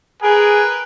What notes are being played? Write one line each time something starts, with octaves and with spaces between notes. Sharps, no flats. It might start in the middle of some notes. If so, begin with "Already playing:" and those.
G#4 A#4 B4 G5 G#5